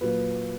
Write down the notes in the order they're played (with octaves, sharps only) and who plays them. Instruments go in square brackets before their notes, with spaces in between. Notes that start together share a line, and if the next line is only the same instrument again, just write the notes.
[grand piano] A#2 F#3 A#3 B4